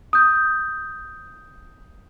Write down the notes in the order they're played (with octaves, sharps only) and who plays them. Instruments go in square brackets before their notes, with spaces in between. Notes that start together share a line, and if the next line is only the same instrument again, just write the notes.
[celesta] D#6 G6